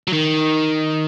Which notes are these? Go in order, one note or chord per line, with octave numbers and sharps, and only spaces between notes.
F#3
D#3